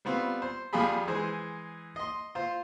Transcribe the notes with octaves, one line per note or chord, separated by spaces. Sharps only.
G3 B3 C4 F4
C5
F2 G3 F4 G4 G#4 B5
E3 G#3 G#4 C5
D#5 C6
F4 C5